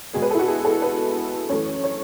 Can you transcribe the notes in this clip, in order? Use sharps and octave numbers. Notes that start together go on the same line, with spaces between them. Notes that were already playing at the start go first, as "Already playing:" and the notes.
B2 G#3 B3 G#4
B4
A4
E4
F#4
G#4
A4
B4
F#2 E3 A3 C#5
C#5